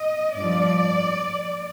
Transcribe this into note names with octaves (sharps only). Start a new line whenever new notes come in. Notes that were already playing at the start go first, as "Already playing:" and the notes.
Already playing: D#5
G2 F3 D5